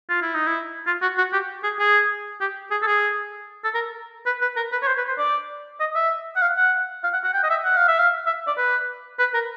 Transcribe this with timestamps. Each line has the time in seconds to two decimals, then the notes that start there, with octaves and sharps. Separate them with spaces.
0.09 F4
0.22 E4
0.35 D#4
0.47 E4
0.87 F4
1.02 F#4
1.18 F#4
1.33 G4
1.64 G#4
1.79 G#4
2.41 G4
2.71 G#4
2.82 A4
2.87 G#4
3.64 A4
3.74 A#4
4.26 B4
4.41 B4
4.56 A#4
4.72 B4
4.82 C#5
4.87 C5
4.98 B4
5.08 C5
5.18 D5
5.80 D#5
5.95 E5
6.36 F#5
6.42 F5
6.57 F#5
7.04 F5
7.14 F#5
7.24 F#5
7.34 G5
7.43 D#5
7.50 E5
7.65 F#5
7.77 F5
7.88 E5
7.99 F5
8.27 E5
8.47 D5
8.58 B4
9.19 B4
9.34 A#4